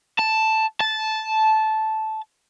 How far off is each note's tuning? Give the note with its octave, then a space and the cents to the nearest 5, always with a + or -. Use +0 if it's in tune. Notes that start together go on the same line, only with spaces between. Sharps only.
A5 +0
A5 -10